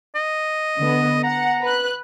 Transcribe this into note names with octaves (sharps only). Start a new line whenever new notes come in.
D#5
D3 B3
F#5 A#5
B4 F#6